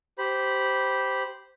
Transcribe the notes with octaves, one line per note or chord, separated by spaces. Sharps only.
G4 C5 B5